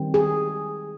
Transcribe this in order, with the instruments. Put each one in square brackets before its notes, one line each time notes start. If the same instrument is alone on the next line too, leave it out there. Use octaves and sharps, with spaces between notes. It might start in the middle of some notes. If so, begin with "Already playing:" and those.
Already playing: [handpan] D#3 G3 C4
G#4